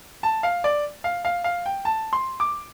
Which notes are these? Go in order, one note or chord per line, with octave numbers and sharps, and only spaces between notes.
A5
F5
D5
F5
F5
F5
G5
A5
C6
D6